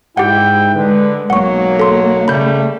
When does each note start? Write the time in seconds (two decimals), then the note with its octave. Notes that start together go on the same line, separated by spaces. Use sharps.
0.17 G#2 E4 G4 F#5 G5
0.75 D3 G#3 B4
1.30 B1 F#3 A#3 F#5 C#6
1.80 A4 C6
2.28 C#3 G3 A3 B5 G6